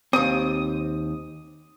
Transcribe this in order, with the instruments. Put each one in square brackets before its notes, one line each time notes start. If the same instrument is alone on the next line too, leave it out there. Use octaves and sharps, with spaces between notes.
[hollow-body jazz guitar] D#2 C4 [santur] D#6